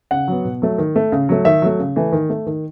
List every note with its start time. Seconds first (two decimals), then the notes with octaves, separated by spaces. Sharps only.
0.11 C#3 F#5
0.28 F#3 B3
0.45 B2
0.62 F#3 A3
0.78 D#3
0.96 A3
1.12 C#3
1.29 F#3 A3
1.45 D#3 E5
1.62 F#3 A3
1.79 C#3
1.96 E3 A3
2.12 D#3
2.30 A3
2.46 D#3